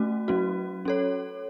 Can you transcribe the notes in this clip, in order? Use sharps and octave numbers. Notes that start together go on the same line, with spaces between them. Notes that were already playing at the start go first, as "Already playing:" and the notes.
Already playing: A3 C#4 F#4
F#3 C#4 F#4
C#4 A4 C#5